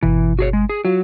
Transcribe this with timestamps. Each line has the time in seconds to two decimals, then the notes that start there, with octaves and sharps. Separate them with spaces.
0.03 G1 B2 E3
0.39 F#4 G#4 C#5
0.53 G#3
0.69 G#4
0.85 F#3 F4 F#4